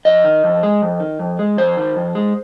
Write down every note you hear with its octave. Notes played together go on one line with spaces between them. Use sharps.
F2 D#5
D#3
F2
G#3
F2
D#3
F2
G#3
F2 C5
D#3
F2
G#3